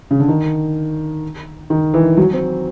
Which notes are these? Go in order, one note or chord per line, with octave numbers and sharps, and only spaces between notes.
C#3
D3
D#3
D#3
E3
F#3
C4